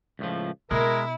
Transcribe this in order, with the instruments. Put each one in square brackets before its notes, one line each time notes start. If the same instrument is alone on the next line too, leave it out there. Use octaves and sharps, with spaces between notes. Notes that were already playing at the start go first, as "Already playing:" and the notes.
[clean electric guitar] C#2 A2 F3
[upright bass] B2 [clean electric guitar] G#3 [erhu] E4 [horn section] A#4